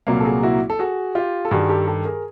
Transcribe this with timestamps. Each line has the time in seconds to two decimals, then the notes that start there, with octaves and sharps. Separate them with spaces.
0.07 C2 A#2 F#3 A#3
0.20 A4
0.25 F#4 G#4
0.43 E4 F#4
0.70 A4
0.79 F#4 G#4
1.15 F4 G4
1.45 A4
1.51 G2 D#3 G3 F#4 G#4
1.69 G4 A4
1.87 G4 A4
2.05 G#4 A#4